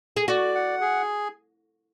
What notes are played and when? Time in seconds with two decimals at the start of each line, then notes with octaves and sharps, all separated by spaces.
0.17 G#4
0.28 F#4 D5
0.55 F#5
0.81 G#4